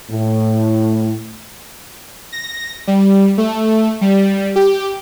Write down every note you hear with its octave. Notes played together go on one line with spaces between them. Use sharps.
A2
A#6
G3
A3
G3
G4